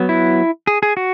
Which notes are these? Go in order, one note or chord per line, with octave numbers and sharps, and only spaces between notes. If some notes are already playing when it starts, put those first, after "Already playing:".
Already playing: F#3 B3
E4
G#4
G#4
F#4